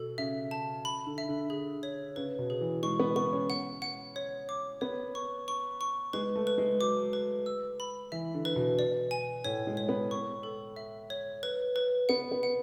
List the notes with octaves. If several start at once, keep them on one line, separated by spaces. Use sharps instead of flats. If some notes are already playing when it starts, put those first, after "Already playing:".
Already playing: B2 A4
C#3 E5
A5
B5
D3
E5
D3
G#4
C#5
C#3 B4
B2
G#4
E3
G#3 C#6
B3
B3 C#6
C#4
F#5
F#5
C#5
D6
B3 C#5
C#6
C#6
C#6
G#3 B4
A3
B4
G#3
F#3 D6
B4
E6
B5
E3 E5
D3
B4
B2
D5
G#5
A2 C#5
G#3
C#5
B3
C#6
A4
E5
C#5
B4
B4
B3 F#5
B3
F#5